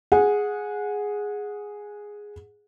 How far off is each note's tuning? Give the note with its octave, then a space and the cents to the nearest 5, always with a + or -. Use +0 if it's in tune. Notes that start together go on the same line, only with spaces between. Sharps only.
G#4 +0 F#5 -20